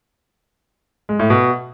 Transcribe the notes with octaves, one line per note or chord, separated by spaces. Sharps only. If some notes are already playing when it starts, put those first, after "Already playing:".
G#3
A2
B2